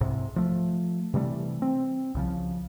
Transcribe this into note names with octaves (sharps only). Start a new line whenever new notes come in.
C2 G#2 C3
F3 A3
C3 E3 G3 A3
C4
C2 C#3 F3